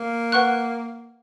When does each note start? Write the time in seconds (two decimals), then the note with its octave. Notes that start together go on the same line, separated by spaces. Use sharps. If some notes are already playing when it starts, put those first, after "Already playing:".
Already playing: A#3
0.32 B4 F#5 C#6 F#6